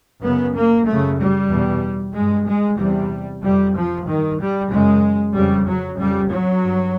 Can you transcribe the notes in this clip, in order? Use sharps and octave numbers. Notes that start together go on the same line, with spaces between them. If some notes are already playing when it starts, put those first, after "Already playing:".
F#2 C#3 B3
A#3
F#2 C#3 A3
G3
E2 B2
G2 G#3
G#3
E2 C3 G3
F2 C3 G3
F3
G2 D#3
G3
F#2 C#3 G#3
F2 C#3 G3
F#3
F2 C#3 G3
F#3
G2